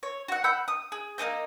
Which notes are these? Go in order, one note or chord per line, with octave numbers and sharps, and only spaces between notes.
C#5
F#4 F#5
F#5 B5 E6 G6
D#6
G#4
A#3 C#4 D#4 G6